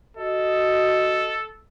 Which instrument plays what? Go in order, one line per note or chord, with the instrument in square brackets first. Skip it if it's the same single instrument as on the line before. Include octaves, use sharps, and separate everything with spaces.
[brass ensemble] F#4 D#5 [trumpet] A4